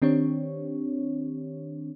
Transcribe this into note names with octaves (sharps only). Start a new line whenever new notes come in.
D#3 C4 D4 G4 C#5